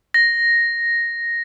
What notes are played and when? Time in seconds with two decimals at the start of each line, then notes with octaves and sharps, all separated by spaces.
0.14 A#6